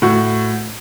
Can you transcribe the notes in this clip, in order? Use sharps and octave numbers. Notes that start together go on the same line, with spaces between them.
A2 F#4